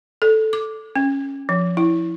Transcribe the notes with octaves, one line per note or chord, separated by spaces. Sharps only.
A4
D6
C#4
F3
E4